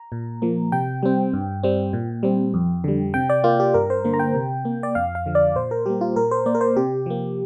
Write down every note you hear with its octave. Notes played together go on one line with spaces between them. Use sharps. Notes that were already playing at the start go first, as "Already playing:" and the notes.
Already playing: A#5
A#2
F3 A#3
C3 G5
G3 C4
G2
G3 C4
A#2
G3 C4
F2
D3 G3
C3 G5
D5
A#3 F4
G4
G2 A#4
C5
D3 A#3
A#5
G5
C3
A#3
D5
F2 F5
F5
D3 F3
D5
A#2 C5
A#4
G3 A#3 G4
F4
A#2 A#4
C5
A#3 D5
A#4
C5
C3 G4
F3 A#3